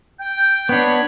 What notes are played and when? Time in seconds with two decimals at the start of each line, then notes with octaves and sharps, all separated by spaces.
0.20 G5
0.69 B3 D4 C#5 B5